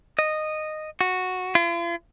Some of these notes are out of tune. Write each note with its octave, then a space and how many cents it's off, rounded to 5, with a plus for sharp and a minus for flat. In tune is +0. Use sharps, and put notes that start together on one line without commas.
D#5 -10
F#4 -10
F4 -45